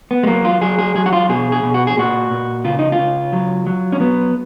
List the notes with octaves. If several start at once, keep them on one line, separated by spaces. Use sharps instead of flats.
B3
G#3
F#3 A#3
F4
F#3 G#4
G#4
F#3 G#4
F#4
F4
B2 G#4
G#4
B2
F#4
G#4
A#2 F#4
A#2
C#3 F4
D#4
F4
C#3
F#3
F#3
C#4
F#3 B3